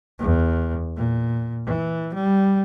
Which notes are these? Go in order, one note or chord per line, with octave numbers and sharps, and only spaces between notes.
E2
A#2
E3
G3